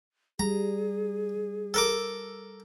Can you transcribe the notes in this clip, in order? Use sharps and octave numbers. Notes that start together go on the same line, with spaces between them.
G3 G#4 A#5
A4 A#4 D6